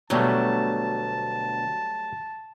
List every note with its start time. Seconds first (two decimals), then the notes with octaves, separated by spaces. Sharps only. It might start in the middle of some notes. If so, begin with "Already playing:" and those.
0.10 D2 B2 F#3 G3 A3 A5